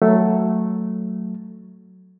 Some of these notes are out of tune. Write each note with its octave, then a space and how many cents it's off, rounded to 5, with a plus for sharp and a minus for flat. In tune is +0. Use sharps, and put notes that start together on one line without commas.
F#3 +0 A3 +0